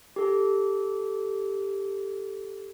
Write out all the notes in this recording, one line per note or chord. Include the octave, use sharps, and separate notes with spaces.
G4 A4